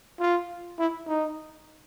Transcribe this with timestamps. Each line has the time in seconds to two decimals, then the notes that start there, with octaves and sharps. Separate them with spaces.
0.20 F4
0.79 E4
1.08 D#4